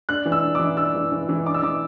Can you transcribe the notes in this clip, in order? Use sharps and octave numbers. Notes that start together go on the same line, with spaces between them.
D4 F#6
E3
E6
D4
E3 D6
D4 E6
E3
E3
E3
D4 D6
E6
E3 D6